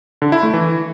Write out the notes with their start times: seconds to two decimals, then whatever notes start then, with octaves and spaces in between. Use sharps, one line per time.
0.22 D3
0.32 E4
0.43 A3
0.53 E3